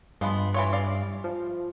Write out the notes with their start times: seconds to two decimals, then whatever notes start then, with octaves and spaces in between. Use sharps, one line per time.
0.21 G2 F3 G#3 B3
0.54 E3 F4 C#5
0.73 D5 F5
1.24 F3